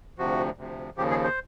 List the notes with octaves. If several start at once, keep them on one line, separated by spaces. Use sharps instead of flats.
D2 C3 F3 F#4
D2 C3 F3
D#2 C#3 F3 G4
G#4
C5